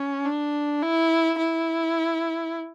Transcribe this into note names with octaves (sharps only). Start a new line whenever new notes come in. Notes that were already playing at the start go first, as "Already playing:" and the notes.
Already playing: C#4
D4
E4
E4